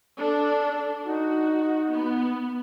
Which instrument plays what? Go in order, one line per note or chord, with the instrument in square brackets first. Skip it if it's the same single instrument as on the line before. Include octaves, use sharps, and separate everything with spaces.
[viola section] D4 A4
[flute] D#4 [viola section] F#4
[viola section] B3